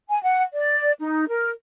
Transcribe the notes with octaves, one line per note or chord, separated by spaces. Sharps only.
G#5
F#5
D5
D#4
A#4